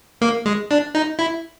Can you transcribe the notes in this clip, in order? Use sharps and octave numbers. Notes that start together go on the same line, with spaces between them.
A#3
G#3
D4
D#4
E4